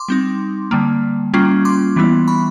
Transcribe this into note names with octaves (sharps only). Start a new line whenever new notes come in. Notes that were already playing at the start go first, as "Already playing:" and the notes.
Already playing: C6 D6
G3 C4 D#4
D3 G3 A#3
G3 A#3 C#4 F4
C6 D6
E3 G3 B3 E4
B5 C#6